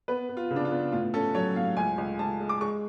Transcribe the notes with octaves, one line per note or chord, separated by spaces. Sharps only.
B3 B4
B3
F4
C#3
D4
F4
B3
A2 F4
C#4 A4
F#3 C#5
A2 F5
C#2 G#5
C#2
C#2 A5
G#3
D6
G#3 C#6